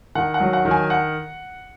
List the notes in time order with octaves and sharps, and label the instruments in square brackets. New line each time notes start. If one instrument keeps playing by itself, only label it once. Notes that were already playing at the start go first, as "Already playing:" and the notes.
[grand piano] D#3 [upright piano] F#5
[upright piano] F#5
[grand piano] F#3
[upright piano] F#5
[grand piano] D#3
[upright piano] G#5
F#5